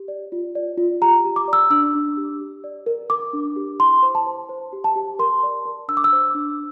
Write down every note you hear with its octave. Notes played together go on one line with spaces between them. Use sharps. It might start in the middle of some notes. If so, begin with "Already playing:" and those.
Already playing: G4
D5
F4
D5
F4
G4 A#5
G4
D6
D5
E6
D4 E6
D4
G4
G4
D5
A#4
A#4 D6
D4
G4
E4 C6
C5
A5
C5
C5
G4
A5
G4
A#4 C6
D5
A#4
D4 E6
D6
E6
C5
D4